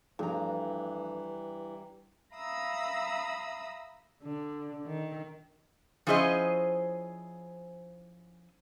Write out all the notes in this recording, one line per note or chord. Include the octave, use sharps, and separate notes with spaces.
G2 E3 F3 A3 D4 A#5
E5 F5 A#5 B5 D#6 E6
D3
D#3
F3 C#4 E4 G#4 C5 D#5